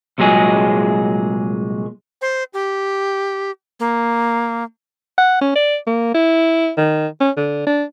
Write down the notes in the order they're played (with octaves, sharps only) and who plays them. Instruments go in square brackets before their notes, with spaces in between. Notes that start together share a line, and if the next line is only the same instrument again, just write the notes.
[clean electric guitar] C2 A#2 F#3 G#3 G#4
[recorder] C5
G4
A#3
[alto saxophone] F#5
C#4
D5
A#3
E4
D#3
C#4
D3
D4